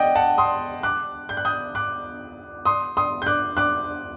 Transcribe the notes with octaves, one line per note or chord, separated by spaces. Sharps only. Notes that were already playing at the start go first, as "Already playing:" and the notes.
Already playing: D5 D#5 F#5 G5
F#5 A5
C6 D#6
D6 F#6
G6
F#6
D#6 G6
D6 F#6
C6 D#6
C6 D#6
G6
D6 F#6
D6 F#6